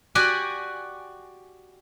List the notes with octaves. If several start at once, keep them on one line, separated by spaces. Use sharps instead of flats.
F#4 G4 D5 F#5 G#5